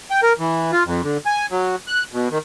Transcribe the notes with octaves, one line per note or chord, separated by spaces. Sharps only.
G5
A#4
E3
F4
F2
D3
G#5
F#3
F#6
B2
D#3